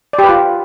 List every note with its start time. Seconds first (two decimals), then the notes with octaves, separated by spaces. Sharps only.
0.13 D5
0.19 G4
0.24 B4
0.29 F4